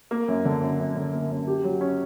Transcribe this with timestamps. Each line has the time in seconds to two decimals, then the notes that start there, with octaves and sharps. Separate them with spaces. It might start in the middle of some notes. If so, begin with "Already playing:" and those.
0.11 A#3
0.28 F#2
0.45 D3
0.61 F#2
0.79 F#2
0.96 D3
1.13 A#3
1.31 F#2
1.47 G4
1.64 F#3
1.81 C#4